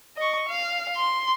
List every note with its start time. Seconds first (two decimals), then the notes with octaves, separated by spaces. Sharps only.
0.17 D#5 C#6
0.49 F5
0.96 C6